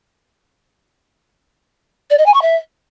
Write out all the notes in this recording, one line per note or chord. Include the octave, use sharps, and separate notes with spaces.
D5
D#5
G#5
C#6
E5